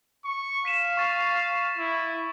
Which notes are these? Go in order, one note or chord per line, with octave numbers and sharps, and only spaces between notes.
C#6
F5 B6 D#7 E7
C#6 A6
E4